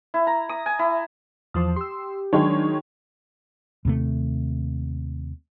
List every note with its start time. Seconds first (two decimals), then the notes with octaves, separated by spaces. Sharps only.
0.14 E4
0.27 A#5
0.49 D#6
0.66 G#5
0.79 E4
1.54 E2 F3 C5 A5 D6 D#6
1.76 G4 C6 E6
2.33 D#3 F#3 G#3 D4 D#4 F#4 C#5
3.85 D#2 C3 A3